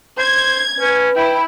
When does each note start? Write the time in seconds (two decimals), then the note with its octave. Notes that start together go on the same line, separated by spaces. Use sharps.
0.18 C5 G#6
0.79 C#4 B4
1.16 E4 G5